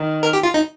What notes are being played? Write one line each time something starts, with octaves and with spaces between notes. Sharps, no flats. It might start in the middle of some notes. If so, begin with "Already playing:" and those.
Already playing: D#3
A#4
G4
F4
D#4